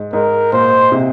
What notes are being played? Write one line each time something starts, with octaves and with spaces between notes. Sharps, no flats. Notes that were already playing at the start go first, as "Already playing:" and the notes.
Already playing: G#2
G#2 A#4
A#2 C5
C3